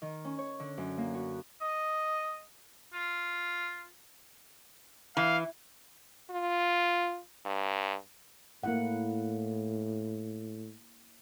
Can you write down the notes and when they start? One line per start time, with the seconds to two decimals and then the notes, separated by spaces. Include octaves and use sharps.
0.02 D#3
0.25 C#4
0.39 C#5
0.60 D3
0.78 F#2
0.97 A#3
1.14 F#4
1.61 D#5
2.93 F4
5.17 E3 F5
6.31 F4
7.46 G2
8.63 A2 A#3 E4 F#5